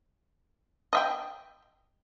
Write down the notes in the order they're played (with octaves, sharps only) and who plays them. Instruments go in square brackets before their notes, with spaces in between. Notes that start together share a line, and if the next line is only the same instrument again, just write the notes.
[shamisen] D#5 E5 G5